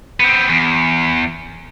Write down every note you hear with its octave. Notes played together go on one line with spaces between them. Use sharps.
B3 C4
E2